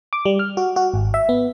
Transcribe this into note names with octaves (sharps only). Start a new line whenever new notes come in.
D6
G3
F6
F#4
F#4
G#1
E5
B3